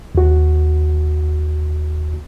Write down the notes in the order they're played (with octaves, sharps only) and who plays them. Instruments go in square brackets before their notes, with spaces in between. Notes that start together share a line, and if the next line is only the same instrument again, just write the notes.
[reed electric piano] D#2 F#4